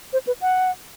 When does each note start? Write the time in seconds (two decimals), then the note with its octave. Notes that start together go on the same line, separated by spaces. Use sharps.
0.13 C5
0.27 B4
0.41 F#5